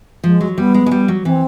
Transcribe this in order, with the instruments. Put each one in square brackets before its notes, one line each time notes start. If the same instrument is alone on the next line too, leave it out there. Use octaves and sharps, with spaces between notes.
[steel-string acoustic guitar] F3 [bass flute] G#3
[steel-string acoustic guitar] F#3
[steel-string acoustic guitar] G3 [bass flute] B3
[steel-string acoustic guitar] G#3
G#3
G3
F#3
[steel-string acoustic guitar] E3 [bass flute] C4